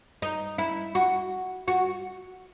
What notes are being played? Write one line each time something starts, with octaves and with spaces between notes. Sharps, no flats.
D#4
E4
F#4
F#4